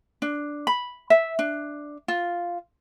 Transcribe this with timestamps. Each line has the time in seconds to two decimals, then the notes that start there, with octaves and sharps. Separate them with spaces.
0.22 D4
0.67 B5
1.10 E5
1.39 D4
2.08 F4